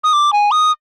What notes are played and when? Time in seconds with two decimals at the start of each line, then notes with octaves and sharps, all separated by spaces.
0.04 D#6
0.13 D6
0.33 G#5
0.51 D#6